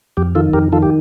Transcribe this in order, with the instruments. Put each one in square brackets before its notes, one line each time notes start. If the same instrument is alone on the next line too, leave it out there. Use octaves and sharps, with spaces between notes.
[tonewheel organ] F2 G4
D#3 F4 A4
F2 G4 A#4
D#3 F4 A4
G4